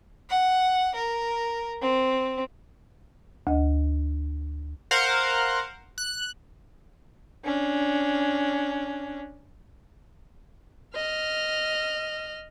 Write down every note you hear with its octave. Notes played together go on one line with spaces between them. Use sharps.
F#5
A#4
C4
D2 D#5
A#4 C5 F5 F#5
F#6
C#4 D4
D#5 F6